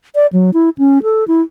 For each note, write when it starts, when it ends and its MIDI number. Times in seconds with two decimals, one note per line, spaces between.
0.15 0.27 74
0.33 0.51 54
0.54 0.70 64
0.78 1.02 61
1.03 1.24 69
1.28 1.42 64